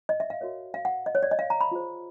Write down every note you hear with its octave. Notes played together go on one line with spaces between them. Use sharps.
D#5
E5
F5
F#4 A#4 C#5
F5
F#5
D#5
C#5
D5
D#5
F5
A#5
B5
F4 G#4 C5